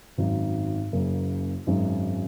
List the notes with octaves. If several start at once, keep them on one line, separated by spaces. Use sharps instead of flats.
G#1 F#2 F#3 D#4
F#1 F#2 C#3 A#3
G#1 F#2 D#3 G#3